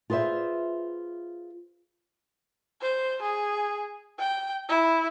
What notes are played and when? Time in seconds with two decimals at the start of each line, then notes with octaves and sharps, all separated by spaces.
0.10 F4 G#4 B4 C5 E5
2.81 C5
3.22 G#4
4.19 G5
4.69 E4